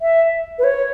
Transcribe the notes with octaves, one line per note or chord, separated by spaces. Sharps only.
E5
B4
C#5